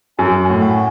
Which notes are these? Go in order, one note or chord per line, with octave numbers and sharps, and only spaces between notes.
F#2 C#4
C#4
A2
F#4